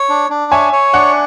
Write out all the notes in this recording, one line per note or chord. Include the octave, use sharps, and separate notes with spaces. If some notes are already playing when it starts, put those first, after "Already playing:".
Already playing: C#5
D4
D4
C#5 E5 G#5
C#5
D4 F#5